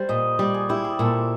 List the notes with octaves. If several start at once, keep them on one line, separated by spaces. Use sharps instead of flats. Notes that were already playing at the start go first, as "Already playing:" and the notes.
Already playing: G3 C5
A#2 D#5
G3 D5
G#4
E4 G4
G#4
A#2 A4